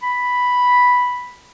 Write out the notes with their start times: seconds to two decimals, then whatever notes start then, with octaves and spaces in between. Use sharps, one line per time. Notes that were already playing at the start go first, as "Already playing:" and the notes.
0.03 B5